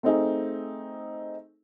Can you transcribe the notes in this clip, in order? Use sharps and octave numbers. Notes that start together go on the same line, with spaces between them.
A3 C4 D#4 G#4